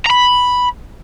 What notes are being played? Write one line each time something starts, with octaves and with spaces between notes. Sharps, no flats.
A#5 B5